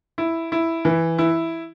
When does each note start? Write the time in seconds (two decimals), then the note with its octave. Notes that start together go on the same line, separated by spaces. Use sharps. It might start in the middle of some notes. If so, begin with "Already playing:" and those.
0.18 E4
0.52 E4
0.85 E3
1.18 E4